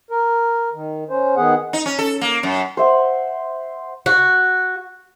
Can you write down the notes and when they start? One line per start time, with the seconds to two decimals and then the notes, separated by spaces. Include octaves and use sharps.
0.11 A#4
0.73 D#3
1.10 C#4 C5
1.36 D#3 B3 G#4 F#5
1.73 D#4
1.86 C#4
1.99 A4
2.21 A#3
2.43 F#2
2.77 C5 E5 F#5
4.06 F#4